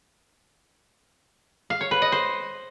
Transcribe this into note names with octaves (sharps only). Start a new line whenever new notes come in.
F5
C#5
B4
D#5
C5